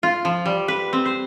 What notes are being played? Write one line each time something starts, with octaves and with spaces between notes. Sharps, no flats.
F4
F3
G3
B4
C4
C5